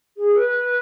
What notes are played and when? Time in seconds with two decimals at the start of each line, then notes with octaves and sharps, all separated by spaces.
0.17 G#4
0.34 B4